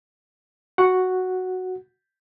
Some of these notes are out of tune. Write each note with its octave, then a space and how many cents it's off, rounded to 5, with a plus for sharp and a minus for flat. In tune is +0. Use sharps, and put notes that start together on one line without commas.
F#4 +0 F#5 +0